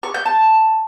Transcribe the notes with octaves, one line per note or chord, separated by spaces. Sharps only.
C#6
G6
A5